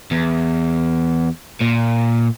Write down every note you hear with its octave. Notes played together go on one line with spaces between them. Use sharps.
E2
A#2